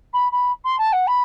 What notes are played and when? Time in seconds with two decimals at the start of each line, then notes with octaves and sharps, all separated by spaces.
0.13 B5
0.32 B5
0.64 C6
0.78 A5
0.92 F#5
1.07 B5